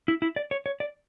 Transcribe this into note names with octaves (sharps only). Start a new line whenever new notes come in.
E4
E4
D5
C#5
C#5
D5